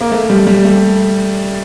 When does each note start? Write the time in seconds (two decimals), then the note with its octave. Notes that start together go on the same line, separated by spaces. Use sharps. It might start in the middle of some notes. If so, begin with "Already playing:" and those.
0.01 A#3
0.12 A3
0.30 G3
0.47 G3
0.65 A3